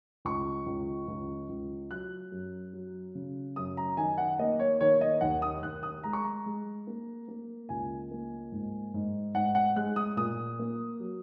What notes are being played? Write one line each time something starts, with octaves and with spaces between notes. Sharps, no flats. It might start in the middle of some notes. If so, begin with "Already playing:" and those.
C#2 C#6
C#2
C#2
C#2
F#3 F#6
F#2
F#3
C#3
F#2 D#6
A#5
D#3 G#5
F#5
A#3 D#5
C#5
D#3 C#5
D#5
D#2 F#5
D#6
D#2 F#6
D#6
G#3 A#5
C#6
A#5
G#3
A#3
A#3
C#2 G#5
A#3
G#2
G#2
G#2 F#5
F#5
G#3 F#6
D#6
A#2 D#6
A#3
F#3